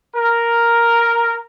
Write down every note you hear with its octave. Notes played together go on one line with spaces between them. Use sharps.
A#4